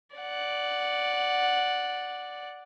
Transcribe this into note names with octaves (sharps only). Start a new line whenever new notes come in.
D5 F#5